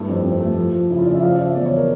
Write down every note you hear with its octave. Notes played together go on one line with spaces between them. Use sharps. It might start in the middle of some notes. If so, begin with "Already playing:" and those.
Already playing: G2 A3 E4
F2
F2
A3
F3
F3
C#3 E4
F4
C#3 D5
E5
F3 F5
D5
F3
E5
E1 D5
C#5
A#4